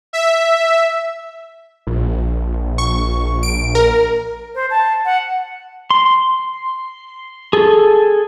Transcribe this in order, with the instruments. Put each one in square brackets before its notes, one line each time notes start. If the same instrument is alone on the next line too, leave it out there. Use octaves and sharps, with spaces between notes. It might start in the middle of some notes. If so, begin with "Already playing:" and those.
[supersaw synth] E5
[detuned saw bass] A#1
[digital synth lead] C#6
D7
A#4
[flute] C5
A5
F#5
[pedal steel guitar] C6
G#4 A4